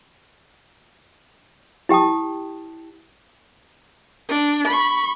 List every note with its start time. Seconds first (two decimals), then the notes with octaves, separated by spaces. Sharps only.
1.89 E4 G4 G5 A5 D#6
4.30 D4
4.68 B5 C#6